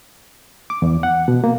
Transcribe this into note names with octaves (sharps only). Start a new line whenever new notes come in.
D6
E2
F#5
B2
A#3